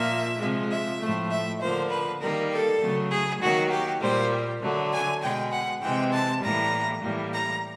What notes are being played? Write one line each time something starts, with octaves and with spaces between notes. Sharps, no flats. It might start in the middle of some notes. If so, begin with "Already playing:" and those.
Already playing: A#2 F3 A#3 E5
C3 F3 G#3
E5
A2 F3 A3
E5
D3 F3 A#3 C5
B4
D#3 G3 A#3 A#4
A4
C#3 F#3 A3
G#4
D#3 F#3 A#3 F#4
G4
A#2 G3 A#3 C5
D3 F#3 A3
G#5
B2 G#3 G5
F#5
C3 E3 G#3 G5
A5
A2 E3 G3 A#3 A#5
A2 E3 G3 A#3
A#5